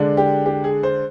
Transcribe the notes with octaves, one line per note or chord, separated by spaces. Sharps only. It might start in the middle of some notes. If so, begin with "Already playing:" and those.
Already playing: D3 G#3 D4
G4
G4
G#4
C5